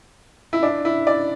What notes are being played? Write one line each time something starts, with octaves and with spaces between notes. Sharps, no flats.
E4
D4
E4
D5